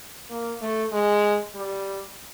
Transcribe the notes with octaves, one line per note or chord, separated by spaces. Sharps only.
A#3
A3
G#3
G3